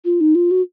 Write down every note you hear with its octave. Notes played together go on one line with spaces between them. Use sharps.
F4
D#4
F4
F#4